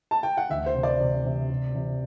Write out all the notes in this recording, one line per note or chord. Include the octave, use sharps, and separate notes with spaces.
A5
G5
F#5
D2 E5
C5
C3
D5
C3
C3
C3
C3